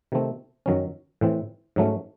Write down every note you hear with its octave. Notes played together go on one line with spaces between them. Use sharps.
C3 D#3 A3 C4
F#2 D#3 F#3 C#4
A2 E3 C4
G#2 F#3 A3 C#4